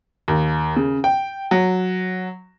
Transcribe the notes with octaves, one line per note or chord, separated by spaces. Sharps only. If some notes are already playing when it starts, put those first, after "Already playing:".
D#2
C#3
G5
F#3